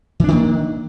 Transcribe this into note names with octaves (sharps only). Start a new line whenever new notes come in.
D#3 E3 A#3 D4